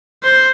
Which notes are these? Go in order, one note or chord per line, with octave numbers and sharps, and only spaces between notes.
C5